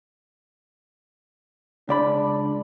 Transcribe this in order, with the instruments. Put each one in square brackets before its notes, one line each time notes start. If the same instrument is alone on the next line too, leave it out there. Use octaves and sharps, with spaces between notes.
[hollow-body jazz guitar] C#2 D5 B5 [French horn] D4